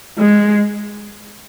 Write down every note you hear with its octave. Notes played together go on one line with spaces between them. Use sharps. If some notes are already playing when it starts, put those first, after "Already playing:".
G#3